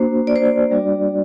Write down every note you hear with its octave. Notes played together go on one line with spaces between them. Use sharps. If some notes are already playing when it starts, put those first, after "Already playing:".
Already playing: A#3 D4 F#4 C5
D5
C5
D5
G3 D4 F#4